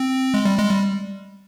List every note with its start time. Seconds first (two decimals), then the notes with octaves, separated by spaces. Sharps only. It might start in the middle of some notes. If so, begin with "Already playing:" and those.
Already playing: C4
0.34 G#3
0.45 G3
0.58 G#3
0.70 G3